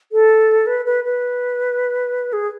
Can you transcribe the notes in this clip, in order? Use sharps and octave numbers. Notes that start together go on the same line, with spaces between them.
A4
B4
B4
B4
G#4